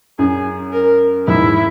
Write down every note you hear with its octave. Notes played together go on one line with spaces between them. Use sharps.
F#2 G#4
A#4
E2 G#2 E4